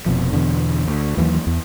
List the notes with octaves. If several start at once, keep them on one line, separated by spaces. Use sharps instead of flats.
F1 B2 F3
E2 B2 D3
D2
D#2 E3 F#3 A#3
E2